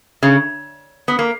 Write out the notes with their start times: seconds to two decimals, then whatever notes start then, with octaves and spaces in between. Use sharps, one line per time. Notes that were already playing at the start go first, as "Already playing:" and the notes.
0.23 C#3
1.08 B3
1.19 A#3